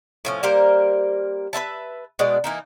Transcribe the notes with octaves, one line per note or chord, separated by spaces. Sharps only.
A2 F3 C#4
G3 A#3 A#4 C5
B4 C5 E5 A5
B2 G#3 D4 D5
E3 A#3 D#4